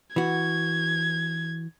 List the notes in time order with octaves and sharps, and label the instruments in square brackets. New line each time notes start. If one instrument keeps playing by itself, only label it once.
[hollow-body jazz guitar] E3 F#4 [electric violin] G#6